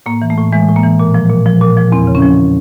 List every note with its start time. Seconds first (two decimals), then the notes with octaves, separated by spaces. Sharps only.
0.06 A2 A#3
0.22 E3
0.30 A3
0.38 A2
0.53 E3 G#3
0.69 A2
0.76 A#3
0.83 E3
1.00 A#2
1.14 F3
1.30 A#2
1.46 F3
1.61 A#2
1.77 F3
1.92 E2 C4
2.07 C#3
2.15 C#4
2.22 F3